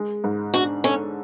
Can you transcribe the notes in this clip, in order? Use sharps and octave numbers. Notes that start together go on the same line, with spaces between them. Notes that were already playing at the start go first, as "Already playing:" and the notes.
Already playing: G#3
G#2
D4 F#4
C#4 A4